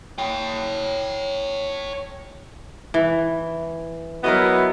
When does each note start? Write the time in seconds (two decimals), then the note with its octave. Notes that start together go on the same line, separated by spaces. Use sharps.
0.18 C#5 G5
2.94 E3
4.24 F#3 B3 E4 A#4 B4 D#5